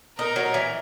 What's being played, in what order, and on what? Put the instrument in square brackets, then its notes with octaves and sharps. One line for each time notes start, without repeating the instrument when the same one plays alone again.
[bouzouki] D#4 [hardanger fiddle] A#4
[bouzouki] F#3
E3